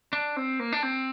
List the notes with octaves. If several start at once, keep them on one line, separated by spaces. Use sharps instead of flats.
D4
C4
A#3
D4
C4